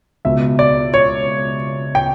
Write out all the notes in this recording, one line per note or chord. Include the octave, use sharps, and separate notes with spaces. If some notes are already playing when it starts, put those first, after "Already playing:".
C#2 B2 E5
D5
C#5
G5